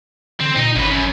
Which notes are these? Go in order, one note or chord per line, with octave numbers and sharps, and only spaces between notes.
D3 C4
A#2 D#4
G1 F#2 B4
F#2